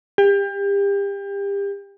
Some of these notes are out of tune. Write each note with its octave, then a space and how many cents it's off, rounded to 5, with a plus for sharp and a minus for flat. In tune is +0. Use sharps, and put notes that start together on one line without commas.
G4 +30